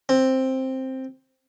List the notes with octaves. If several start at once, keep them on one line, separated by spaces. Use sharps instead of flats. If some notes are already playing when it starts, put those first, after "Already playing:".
C4